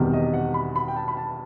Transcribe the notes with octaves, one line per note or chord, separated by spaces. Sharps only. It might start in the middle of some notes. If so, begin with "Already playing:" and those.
Already playing: E1 E2 C3 D#3 G3
D#5
F#5
B5
B5
G5
A5
B5
A5